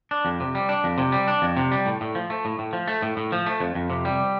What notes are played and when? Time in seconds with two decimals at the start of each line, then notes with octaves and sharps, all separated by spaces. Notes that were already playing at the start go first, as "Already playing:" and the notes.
0.11 D4
0.25 F2
0.40 C3
0.55 G3
0.69 D4
0.84 F2
0.98 C3
1.12 G3
1.28 D4
1.42 F2
1.57 C3
1.72 G3
1.86 A2
2.01 A2
2.15 F3
2.30 A3
2.45 A2
2.59 A2
2.73 F3
2.88 A3
3.02 A2
3.17 A2
3.32 F3
3.46 A3
3.60 F2
3.75 F2
3.90 C3
4.05 G3